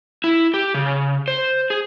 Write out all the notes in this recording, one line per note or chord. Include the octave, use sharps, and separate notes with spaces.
E4
G4
C#3
C5
G#4